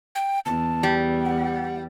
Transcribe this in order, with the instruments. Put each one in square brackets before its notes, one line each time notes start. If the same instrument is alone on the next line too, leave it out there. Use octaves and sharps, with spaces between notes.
[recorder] G5
[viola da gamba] E2 [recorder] A5
[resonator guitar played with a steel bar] G3
[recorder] F#5